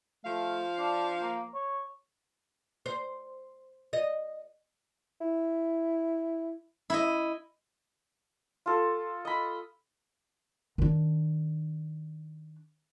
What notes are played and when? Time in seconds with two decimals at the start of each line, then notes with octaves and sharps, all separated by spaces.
0.25 F3 A3 F5
0.79 D4
1.21 A#3
1.54 C#5
2.86 C5
3.93 D#5
5.21 E4
6.90 E4 D#5
8.66 F4 A4
9.25 D#5 B5
10.78 D#3 D4